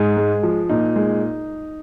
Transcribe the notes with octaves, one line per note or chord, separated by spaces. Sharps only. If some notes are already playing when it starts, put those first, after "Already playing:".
Already playing: G#2 G#4
G#3
F3
A#2 D#4
G#3